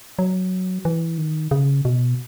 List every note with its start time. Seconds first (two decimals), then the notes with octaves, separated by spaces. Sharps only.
0.19 F#3
0.85 E3
1.18 D#3
1.51 C#3
1.85 B2